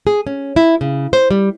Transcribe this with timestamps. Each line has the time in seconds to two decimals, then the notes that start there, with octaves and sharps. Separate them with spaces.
0.07 G#4
0.27 C#4
0.56 E4
0.81 C#3
1.13 C5
1.31 G3